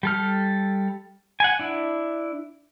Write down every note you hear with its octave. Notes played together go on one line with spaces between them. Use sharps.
G3 A4 F6
F#5 G#5
D4 E4